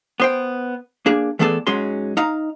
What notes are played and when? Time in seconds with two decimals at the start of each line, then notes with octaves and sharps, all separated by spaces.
0.20 B3 C5 G5
1.06 A#3 D4 G#4
1.39 E3 A3 B3 G#4 A4 D5
1.67 G#2 F#3 G#3 C#4 C6
2.17 D#4 F5 A#5